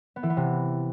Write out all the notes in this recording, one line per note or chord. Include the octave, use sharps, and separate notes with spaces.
B3
E3
B3
C3